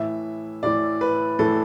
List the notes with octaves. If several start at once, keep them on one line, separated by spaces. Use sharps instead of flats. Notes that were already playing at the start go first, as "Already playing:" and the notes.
Already playing: A2 E3 E5
A2 E3 D5
B4
A2 E3 A4